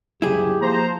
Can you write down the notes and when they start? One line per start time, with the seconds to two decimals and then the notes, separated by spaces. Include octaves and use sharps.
0.22 C#3 F#3 G3 E4 G4 G#4
0.61 F3 A#3 C5 A#5